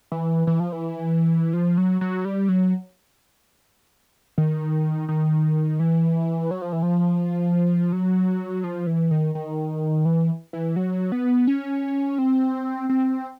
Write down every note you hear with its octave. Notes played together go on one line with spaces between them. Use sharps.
E3
E3
F3
E3
F3
F#3
F#3
G3
F#3
D#3
D#3
E3
F#3
F3
E3
F3
F#3
F3
E3
D#3
D#3
E3
E3
F#3
B3
C#4
C4
C4